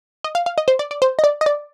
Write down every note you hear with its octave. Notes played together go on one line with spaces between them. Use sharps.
D#5
F5
F5
D#5
C5
D5
D5
C5
D#5
D5
D#5
D5